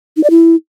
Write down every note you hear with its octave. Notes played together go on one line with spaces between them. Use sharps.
D#4
D5
E4